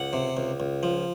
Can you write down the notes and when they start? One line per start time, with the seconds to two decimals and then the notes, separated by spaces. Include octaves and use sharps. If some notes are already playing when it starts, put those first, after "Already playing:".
Already playing: C#2 F#5
0.13 C3
0.37 C#2
0.60 C#2
0.83 F3